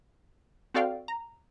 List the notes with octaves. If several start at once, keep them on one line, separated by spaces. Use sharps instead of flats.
C4 F#4 A4 D5 F5 G5
A#5